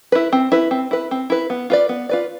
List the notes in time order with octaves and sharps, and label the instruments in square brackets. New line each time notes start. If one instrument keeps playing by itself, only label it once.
[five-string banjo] E4 B4
C4
E4 B4
C4
E4 B4
C4
E4 B4
B3
F4 B4 D5
B3
F4 B4 D5